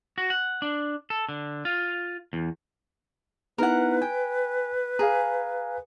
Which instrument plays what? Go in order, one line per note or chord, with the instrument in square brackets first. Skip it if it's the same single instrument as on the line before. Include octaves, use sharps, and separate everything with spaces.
[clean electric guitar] F#4
F#5
D4
A4
D3
F4
E2
[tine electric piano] B3 D#4 E4 [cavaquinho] A#4 F#5 [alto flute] B4
[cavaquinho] G5 [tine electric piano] G#5
[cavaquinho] G#4 [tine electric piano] F5 G#5 A#5